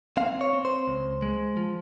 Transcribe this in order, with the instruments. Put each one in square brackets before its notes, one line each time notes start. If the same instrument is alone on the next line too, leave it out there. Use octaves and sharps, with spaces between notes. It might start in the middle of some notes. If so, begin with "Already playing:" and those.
[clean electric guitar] C4 F5
C#5
C4
C5
C#2
G#3
F3